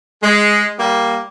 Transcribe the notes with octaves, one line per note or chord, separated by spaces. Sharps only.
G#3
G3 A#3